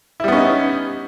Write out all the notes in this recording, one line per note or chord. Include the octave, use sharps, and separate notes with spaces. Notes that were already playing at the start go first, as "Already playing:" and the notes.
G3 B3 C#4 D#4 E4